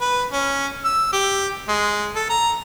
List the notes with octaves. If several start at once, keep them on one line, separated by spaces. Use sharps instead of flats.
B4
C#4
E6
G4
G#3
A4
A#5